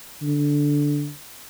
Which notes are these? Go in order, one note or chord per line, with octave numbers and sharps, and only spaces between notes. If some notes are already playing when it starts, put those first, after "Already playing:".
D3